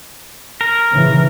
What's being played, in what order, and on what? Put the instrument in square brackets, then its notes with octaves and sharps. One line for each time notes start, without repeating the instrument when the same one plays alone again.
[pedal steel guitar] A#4
[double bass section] C#3 E3